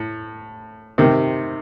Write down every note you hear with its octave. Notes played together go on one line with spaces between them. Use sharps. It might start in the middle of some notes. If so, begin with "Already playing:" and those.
Already playing: A2
C3 D#3